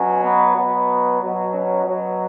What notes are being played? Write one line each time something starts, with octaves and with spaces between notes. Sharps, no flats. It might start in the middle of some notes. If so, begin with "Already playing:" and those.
Already playing: B2 F#3 C#4
B3
B2 F#3 B3
B2 F#3
C#4
B2 F#3